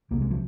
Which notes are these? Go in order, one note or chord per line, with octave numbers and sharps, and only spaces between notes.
C2 C3 A#3
G#3
F3